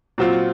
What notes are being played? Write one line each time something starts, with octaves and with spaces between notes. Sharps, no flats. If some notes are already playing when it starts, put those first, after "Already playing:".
A#2 F#3 C4 F4